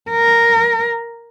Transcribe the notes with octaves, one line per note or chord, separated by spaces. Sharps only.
A#4